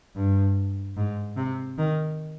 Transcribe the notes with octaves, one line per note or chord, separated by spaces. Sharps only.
G2
G#2
C3
D#3